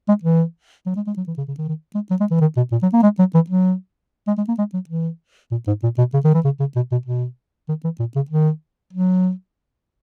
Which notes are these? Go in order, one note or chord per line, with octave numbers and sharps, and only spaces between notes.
G#3
E3
F#3
G#3
G#3
F#3
E3
C#3
C#3
D#3
D#3
G#3
F#3
G#3
E3
D#3
B2
A#2
F#3
A#3
G#3
F#3
E3
F#3
G#3
G#3
A#3
G#3
F#3
E3
A#2
G#2
A#2
B2
C#3
D#3
E3
C#3
C#3
B2
B2
B2
D#3
E3
A#2
C#3
D#3
F#3